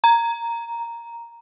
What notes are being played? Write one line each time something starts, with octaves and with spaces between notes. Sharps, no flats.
A#5